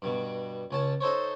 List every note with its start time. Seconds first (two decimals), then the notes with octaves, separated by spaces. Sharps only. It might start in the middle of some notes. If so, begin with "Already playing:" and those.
0.02 G2 B2
0.71 C#2 C#4 A5
1.01 D#4 A4 C5 C#5